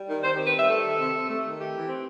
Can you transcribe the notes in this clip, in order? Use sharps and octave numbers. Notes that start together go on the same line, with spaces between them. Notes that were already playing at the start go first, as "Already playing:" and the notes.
Already playing: G3
D#3
D#3 C5
G4
C4
B4
G3 E5
A3 A4
D#3
C3
C3
A3
D#3
A3 G4
E3
C4